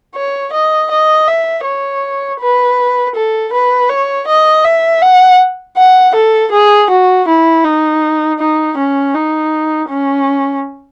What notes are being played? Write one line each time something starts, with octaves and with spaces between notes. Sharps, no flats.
C#5
D#5
D#5
E5
C#5
B4
A4
B4
C#5
D#5
E5
F#5
F#5
A4
G#4
F#4
E4
D#4
D#4
C#4
D#4
C#4